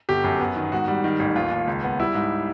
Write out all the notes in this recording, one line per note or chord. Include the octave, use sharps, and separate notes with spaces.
G1 G4
F#2
B3
D#3
G#2 F#4
G3
D#3
A1
D#2 F4
D#2
C#2
B3
G3 E4
G#2